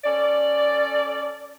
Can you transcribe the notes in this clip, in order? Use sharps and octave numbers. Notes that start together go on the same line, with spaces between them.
C#4 A4 D5